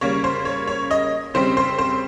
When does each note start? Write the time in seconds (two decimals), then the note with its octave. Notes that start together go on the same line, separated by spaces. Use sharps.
0.01 C#3 G3 A#3 C#5
0.24 C5
0.45 C#5
0.67 C#5
0.91 D#5
1.34 C#3 G3 C4 C5
1.57 C5
1.78 C5